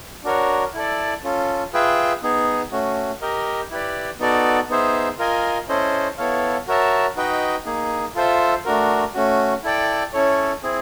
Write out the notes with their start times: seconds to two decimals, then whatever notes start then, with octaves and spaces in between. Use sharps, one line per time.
0.24 D4 F#4 A#4 C#5
0.74 E4 A4 D5
1.24 C#4 F4 A4
1.73 F4 G#4 B4 E5 G5
2.23 B3 D#4 G#4
2.72 A3 C#4 F#4
3.22 G4 A#4 D#5
3.70 E4 G4 B4 D5
4.20 B3 D#4 F#4 A4 D5
4.70 B3 D#4 G#4 C5 E5
5.19 F4 A#4 D#5 G#5
5.68 C#4 E4 A4 C5 D#5
6.17 B3 E4 A4 C#5 F5
6.67 F#4 A#4 C#5 E5 A5
7.16 D#4 F#4 B4 D#5 G5
7.66 A#3 D#4 G#4
8.15 F4 A4 C5 E5
8.65 A3 D4 F#4 A#4
9.14 A3 C#4 F#4
9.63 E4 A4 D5 G5
10.13 C#4 E4 A4 C#5
10.63 C4 E4 G#4